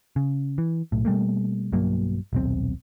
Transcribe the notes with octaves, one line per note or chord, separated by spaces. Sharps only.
C#3
E3
B1 A2
B2 G3 A3 A#3
B1 G2 F#3 A#3
D#1 B1 C4